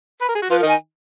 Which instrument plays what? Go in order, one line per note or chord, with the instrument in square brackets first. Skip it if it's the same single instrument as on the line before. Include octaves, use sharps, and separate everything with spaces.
[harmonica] B4
A#4
G#4
F#4
[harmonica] F3 F4 [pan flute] B4
[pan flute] A#4
[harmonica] D#3 D#4
[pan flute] G#5